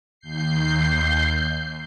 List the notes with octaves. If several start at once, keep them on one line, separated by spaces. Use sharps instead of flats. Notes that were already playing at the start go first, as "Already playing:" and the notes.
D#2 G6 C7